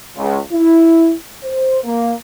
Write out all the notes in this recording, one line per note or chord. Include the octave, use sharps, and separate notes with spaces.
C#2
E4
C5
A#3